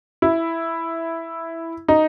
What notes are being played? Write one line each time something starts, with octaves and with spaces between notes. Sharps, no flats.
E4
D#4